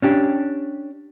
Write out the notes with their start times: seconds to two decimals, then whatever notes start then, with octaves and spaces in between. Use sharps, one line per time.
0.02 C#4 D4 G4